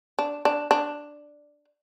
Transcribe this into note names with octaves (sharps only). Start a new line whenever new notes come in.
D4
D4
D4